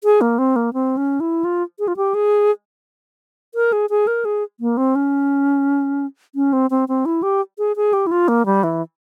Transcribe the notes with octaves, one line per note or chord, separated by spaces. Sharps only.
G#4
A#3
C4
A#3
C4
C#4
E4
F4
G#4
F4
G4
G#4
A#4
G#4
G#4
A#4
G#4
A#3
C4
C#4
C#4
C4
C4
C4
E4
G4
G#4
G#4
G4
E4
F4
A#3
G3
E3